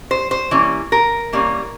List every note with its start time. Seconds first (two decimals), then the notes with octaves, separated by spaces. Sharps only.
0.11 C5
0.31 C5
0.51 E3 G3 A#3 C#4
0.92 A#4
1.33 E3 G3 A#3 C#4